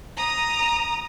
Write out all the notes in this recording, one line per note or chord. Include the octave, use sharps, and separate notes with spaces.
A#5 D#6